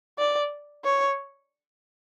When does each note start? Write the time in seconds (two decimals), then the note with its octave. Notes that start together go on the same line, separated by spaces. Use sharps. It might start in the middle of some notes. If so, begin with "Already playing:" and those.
0.19 D5
0.84 C#5